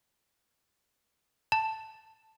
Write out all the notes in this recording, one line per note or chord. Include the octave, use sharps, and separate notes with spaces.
A5